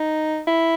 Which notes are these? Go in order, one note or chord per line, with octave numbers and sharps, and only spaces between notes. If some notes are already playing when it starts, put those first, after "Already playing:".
Already playing: D#4
E4